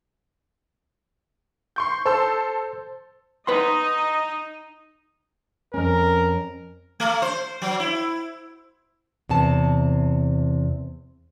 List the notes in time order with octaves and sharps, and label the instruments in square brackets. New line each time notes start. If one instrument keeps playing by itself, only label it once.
[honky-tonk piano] C6 C#6 G6
[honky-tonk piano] A4 C6 E6 [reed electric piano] C5
[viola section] D#4 D#5 [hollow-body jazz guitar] B4 F#5 C6
[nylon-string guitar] F2 C#4 [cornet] A#4
[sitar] A3
C5
F#3
E4
[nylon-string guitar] E2 C3 A5